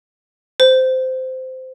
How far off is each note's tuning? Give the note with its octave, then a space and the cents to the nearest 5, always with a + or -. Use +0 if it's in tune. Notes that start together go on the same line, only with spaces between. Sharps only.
C5 -15